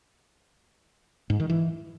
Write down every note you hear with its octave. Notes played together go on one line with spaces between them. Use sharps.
G#2
D#3
E3